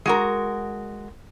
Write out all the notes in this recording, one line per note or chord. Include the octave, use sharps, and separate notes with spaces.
G#3 F#4 A#4